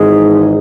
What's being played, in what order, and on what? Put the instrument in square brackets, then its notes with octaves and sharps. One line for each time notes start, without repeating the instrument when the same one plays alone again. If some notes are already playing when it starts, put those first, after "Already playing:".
Already playing: [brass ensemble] G#1 G#2 E3 G#3 D#4 [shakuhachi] G#4